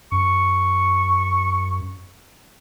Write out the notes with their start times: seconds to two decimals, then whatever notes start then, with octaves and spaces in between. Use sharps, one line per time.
0.12 F#2 C#6